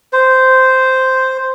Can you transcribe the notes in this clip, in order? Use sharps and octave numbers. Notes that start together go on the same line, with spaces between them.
C5